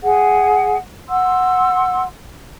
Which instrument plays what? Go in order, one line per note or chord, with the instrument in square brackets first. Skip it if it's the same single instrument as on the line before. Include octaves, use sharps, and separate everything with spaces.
[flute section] G#4 F#5
F#5 C6 E6